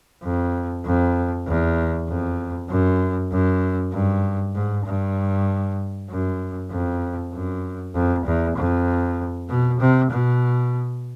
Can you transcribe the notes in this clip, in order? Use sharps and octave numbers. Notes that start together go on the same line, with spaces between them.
F2
F2
E2
F2
F#2
F#2
G2
G#2
G2
F#2
F2
F#2
F2
E2
F2
B2
C3
B2